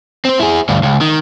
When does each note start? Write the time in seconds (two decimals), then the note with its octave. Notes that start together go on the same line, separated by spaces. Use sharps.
0.25 C4 C5
0.39 E4 G#4
0.69 D2 G2
0.83 C#2
1.01 D#3